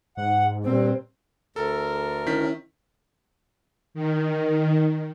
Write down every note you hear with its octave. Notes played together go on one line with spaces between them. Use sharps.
G#2 F#5
G2 A#2 C4
D2 A4 A#4
D#3 C#4 E4 B6
D#3